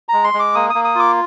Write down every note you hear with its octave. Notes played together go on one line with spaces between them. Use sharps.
G#3 A#5
C6
G#3
D6
A#3 D#6
A#3 D#6
D#6
F4 D6